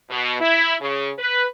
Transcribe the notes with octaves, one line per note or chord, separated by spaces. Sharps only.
B2
E4
C#3
B4